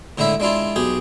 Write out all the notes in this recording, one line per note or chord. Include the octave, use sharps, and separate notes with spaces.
A2 D3 G#3 E4 E5
G#3 D4 E4 F4
B1 G4 G#4